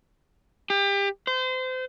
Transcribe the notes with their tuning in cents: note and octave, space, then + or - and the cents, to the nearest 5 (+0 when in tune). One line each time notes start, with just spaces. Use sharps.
G4 +30
C5 -30